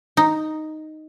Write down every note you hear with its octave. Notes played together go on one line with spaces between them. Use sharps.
D#4